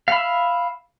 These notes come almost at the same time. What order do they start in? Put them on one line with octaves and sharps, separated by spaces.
F5 B5 E5